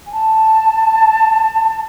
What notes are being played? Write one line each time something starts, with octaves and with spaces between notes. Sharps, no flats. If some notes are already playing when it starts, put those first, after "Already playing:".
G#5
A5